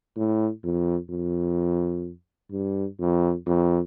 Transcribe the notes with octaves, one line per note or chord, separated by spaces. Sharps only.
A2
F2
F2
G2
F2
F2